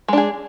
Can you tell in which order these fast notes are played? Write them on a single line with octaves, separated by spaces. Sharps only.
G#3 D4 G#4